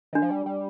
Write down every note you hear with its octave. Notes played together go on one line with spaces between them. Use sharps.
D#3 D4
F3
G3
G3